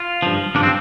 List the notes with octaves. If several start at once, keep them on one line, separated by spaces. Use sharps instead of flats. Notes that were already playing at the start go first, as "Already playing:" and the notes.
Already playing: F4
G2 F3
G2 F3 D4
C4